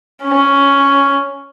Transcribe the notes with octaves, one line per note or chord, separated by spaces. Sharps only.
C#4